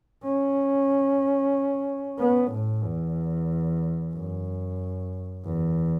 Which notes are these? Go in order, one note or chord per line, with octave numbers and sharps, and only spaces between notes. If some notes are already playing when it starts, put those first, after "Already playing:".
C#4
B3
A2
E2
F#2
E2